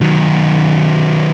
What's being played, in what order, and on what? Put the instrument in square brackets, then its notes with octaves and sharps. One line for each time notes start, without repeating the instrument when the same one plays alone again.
[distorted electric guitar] D#3 F#3